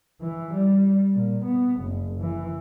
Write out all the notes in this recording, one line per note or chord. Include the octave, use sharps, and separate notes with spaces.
E3
G3
A#2
B3
F#1
E3